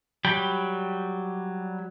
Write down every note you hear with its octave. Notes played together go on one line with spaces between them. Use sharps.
F#3 G3 G5 B5